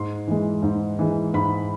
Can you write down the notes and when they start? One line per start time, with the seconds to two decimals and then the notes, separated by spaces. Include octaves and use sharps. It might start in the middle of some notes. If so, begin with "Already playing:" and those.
Already playing: G#2 C6
0.27 E3 G#3
0.62 G#2
0.99 E3 G#3
1.34 G#2 B5